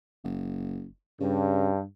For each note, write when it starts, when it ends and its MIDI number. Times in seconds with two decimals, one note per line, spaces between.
0.24 0.87 30
1.20 1.81 43
1.20 1.70 49